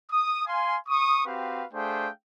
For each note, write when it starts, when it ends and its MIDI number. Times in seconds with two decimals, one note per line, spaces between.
0.11 0.46 87
0.46 0.76 77
0.46 0.76 80
0.46 0.76 84
0.89 1.26 85
0.89 1.26 87
1.26 1.65 60
1.26 1.65 66
1.26 1.65 67
1.26 1.65 71
1.26 1.65 77
1.73 2.09 57
1.73 2.09 62
1.73 2.09 68
1.73 2.09 72
1.73 2.09 77
1.73 2.09 79